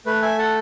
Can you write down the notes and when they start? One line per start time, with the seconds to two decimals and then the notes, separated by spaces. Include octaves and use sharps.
0.06 A3 B4
0.22 E5 G#5
0.38 A4 F#5 A5